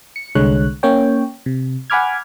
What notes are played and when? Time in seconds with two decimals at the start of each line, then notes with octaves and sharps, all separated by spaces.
0.16 C#7
0.35 C2 D3 G#3 C#5 F#6
0.83 A#3 C#4 C#5 G5
1.46 C3
1.90 F#5 G#5 B5 D6 F6 G#6